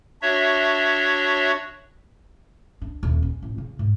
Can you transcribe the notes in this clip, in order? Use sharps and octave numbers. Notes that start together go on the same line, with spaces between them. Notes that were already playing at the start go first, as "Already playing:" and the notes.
D4 F#4 C#5 E5
D4
D#1
C#4
A1
C#3
G#2